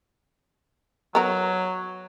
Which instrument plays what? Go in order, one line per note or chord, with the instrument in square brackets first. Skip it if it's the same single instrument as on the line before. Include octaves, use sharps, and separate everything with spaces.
[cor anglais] F#3 [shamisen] B3 A#4